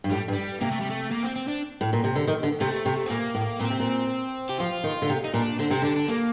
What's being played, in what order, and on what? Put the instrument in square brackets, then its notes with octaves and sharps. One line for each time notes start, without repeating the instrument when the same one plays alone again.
[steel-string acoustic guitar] G2
[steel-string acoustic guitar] A2 [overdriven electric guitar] G3
[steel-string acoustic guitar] G2
[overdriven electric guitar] G3
[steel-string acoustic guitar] C3 [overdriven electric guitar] A#3
[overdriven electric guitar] A3
G3
A3
A#3
C4
C4
D4
[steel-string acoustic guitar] A2
A#2
C3
D3
D#3
D3
[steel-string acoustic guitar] C3 [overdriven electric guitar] A3
[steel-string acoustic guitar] C3
[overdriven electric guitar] C4
[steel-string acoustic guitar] A#2 [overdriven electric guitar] A#3
[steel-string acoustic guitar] A2
[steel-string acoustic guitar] A#2 [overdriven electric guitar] C4
[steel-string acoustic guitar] C3
A#2
[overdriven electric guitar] G4
[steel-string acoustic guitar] F3 [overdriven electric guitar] F4
[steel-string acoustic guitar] D#3
D3
C3
[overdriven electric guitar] D#4
[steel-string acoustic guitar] A#2 [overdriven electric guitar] D4
[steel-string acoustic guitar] D3 [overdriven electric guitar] C4
[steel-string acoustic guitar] C3 [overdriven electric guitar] C4
[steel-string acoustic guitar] D3 [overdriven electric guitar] D4
[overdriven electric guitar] D4
A#3